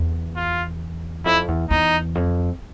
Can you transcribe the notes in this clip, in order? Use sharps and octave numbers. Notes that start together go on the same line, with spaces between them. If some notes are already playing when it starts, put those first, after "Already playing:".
Already playing: E2
F4
F2 E4
E2
E2 D#4
F2